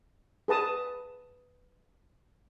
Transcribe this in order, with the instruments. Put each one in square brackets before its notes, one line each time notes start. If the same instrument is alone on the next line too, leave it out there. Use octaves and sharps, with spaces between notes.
[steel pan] G#4 B4 A5 D#6